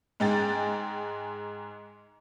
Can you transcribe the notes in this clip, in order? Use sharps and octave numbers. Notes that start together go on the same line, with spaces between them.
G#2 G#3 G5 A6